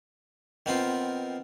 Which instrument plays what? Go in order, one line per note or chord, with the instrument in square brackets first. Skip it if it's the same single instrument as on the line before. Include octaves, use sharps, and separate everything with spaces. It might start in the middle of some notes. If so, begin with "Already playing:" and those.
[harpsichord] D#3 B3 C4 F4